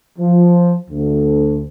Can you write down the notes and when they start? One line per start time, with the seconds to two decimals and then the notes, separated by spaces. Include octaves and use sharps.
0.19 F3
0.91 D2